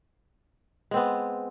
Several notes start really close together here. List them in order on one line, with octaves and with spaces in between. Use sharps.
G#3 C4 B3